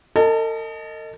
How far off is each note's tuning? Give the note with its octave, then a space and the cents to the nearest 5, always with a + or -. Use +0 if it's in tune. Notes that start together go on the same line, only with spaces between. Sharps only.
A4 +45 D#5 +0 A5 -25